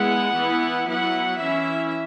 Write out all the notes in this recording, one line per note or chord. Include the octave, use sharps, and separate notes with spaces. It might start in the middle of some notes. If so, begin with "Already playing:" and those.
Already playing: G#3 B3 E4 F#5
E3 B3 E4
F#3 B3 E4 F#5
E3 C#4 E4 E5